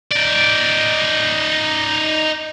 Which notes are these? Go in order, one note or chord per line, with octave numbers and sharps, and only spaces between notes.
D#4 D5